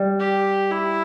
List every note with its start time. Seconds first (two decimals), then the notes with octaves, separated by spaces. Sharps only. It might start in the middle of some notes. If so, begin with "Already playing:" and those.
Already playing: G3
0.20 G4
0.71 E4